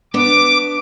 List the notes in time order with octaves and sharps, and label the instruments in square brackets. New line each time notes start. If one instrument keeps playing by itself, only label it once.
[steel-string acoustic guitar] B3 D4 [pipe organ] D6